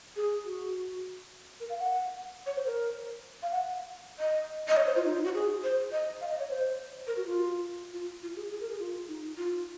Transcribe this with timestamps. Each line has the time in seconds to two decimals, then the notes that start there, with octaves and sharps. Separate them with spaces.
0.16 G#4
0.45 F#4
1.60 A#4
1.69 F5
1.80 F#5
2.46 C#5
2.56 C5
2.66 A#4
3.43 F5
3.52 F#5
4.19 D#5
4.68 D#5
4.77 C#5
4.87 C5
4.96 F4
5.05 D#4
5.15 F4
5.24 F#4
5.35 G#4
5.64 C5
5.92 D#5
6.21 F5
6.30 D#5
6.40 C#5
6.50 C5
7.07 A#4
7.17 F#4
7.26 F4
7.93 F4
8.23 F4
8.36 G#4
8.51 G#4
8.61 A#4
8.70 G#4
8.79 F4
9.08 D#4
9.38 F4